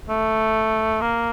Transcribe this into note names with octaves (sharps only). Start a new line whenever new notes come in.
A3
A#3